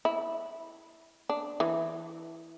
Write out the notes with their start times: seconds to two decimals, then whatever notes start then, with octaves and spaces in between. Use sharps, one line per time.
0.05 E4
1.29 D4
1.60 E3